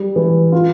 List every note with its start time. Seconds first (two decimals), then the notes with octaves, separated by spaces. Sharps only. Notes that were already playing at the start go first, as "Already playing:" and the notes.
Already playing: G3
0.16 E3
0.52 F4